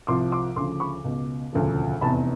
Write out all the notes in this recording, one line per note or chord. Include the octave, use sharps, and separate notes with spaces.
C2 C3 F3 C6 D6
C6 D6
D2 C#3 F3 C6 D6
B5 C#6
C#2 B2
E1 D2 C#3 F3
F1 E2 C3 A5 B5